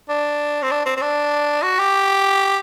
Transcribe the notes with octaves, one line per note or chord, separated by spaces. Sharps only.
D4
C4
D4
C4
C4
D4
F#4
G4